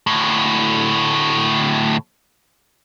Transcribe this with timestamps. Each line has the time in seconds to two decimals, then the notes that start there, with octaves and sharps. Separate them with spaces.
0.07 D2 A2